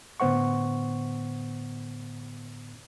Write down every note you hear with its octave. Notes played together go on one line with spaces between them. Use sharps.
A2 D3 B3 C5 F#5 C#6